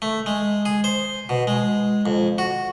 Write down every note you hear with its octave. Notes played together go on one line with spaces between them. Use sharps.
A3
G#3
G#4
C5
B2
G#3
F2
F#4